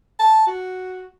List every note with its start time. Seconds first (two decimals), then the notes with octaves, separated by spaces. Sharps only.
0.20 A5
0.47 F#4